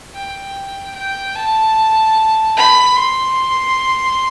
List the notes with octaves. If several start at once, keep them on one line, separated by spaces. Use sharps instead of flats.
G5
G5
A5
B5
C6